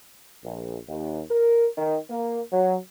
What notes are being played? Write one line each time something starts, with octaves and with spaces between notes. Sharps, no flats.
A#1
D#2
A#4
D#3
A#3
F#3